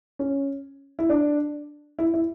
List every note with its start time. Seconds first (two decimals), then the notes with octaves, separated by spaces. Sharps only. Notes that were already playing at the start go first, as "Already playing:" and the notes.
0.19 C#4
0.99 E4
1.09 D4
1.99 E4
2.14 E4